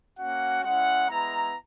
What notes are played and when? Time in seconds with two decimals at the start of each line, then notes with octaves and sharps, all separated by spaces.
0.18 A#3 C#4 F#4 F#5
0.63 G#3 C#4 E4 F#5
1.09 G#3 B3 E4 A#5